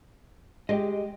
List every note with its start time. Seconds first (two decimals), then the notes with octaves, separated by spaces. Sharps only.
0.69 G#3 G4 D#5